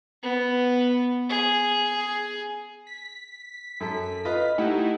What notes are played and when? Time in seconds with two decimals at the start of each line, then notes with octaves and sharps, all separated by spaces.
0.23 B3
1.29 G#4
2.87 B6
3.80 F#2 A4
4.25 F4 B4 D#5
4.58 A3 D#4 E4 G4 F#5